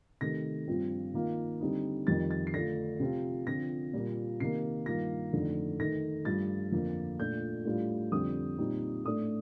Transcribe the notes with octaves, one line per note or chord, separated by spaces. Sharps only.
C3 D#3 A3 A#6
G2 F3 C4 F4
D#3 A#3 F4
D3 G3 C4 D#4
F2 D#3 G3 A6
A6
C7
D3 A3 D4 F4 A#6
C3 F3 C4 F4
D3 F3 C4 F4 A#6
A#2 G3 A#3 F4
C3 D#3 A#3 C7
G2 D#3 A#3 F4 A#6
F2 D3 A3 D#4
D#3 A3 D#4 A#6
G2 F3 A3 A6
F2 D3 F3 A#3
A#2 A3 D4 F4 G6
A2 G3 D4 F4
F2 D3 G3 C4 D#6
A#2 G3 C4 D#4
A2 A3 D4 D#6